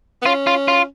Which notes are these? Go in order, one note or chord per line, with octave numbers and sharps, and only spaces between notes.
B3
C#4 F4
F4
F4